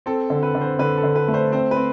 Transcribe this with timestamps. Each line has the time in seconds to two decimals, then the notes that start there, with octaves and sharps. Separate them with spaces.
0.06 C4 A4
0.30 D3
0.43 B4
0.55 D3
0.61 C5
0.79 D3 B4
0.97 A4
1.04 D3
1.16 B4
1.28 A3
1.34 C5
1.52 C4 C5
1.71 B4
1.77 C4